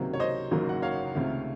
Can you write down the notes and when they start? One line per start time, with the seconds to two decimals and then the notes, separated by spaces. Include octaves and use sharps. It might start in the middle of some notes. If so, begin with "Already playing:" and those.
Already playing: C#2 C3 D#3 F#3 A#3
0.14 C#5
0.20 C5 D#5
0.51 F#1 F#2 D#3 F#3 A#3
0.69 F#5
0.82 C#5 F5
1.15 C#2 C3 D#3 A3